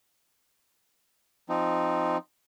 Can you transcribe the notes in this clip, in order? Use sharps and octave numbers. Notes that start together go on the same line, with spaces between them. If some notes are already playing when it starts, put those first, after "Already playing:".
F3 C4 D#4